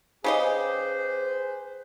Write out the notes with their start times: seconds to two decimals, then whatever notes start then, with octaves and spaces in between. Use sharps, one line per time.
0.24 C#3 G4 G#4 B4 C5 D#5